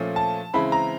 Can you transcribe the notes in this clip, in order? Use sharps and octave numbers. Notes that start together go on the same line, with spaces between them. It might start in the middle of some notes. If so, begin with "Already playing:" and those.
Already playing: A#2 F3 A3 C#4
A5
C#3 E3 G#3 C4 E4 B5
A#5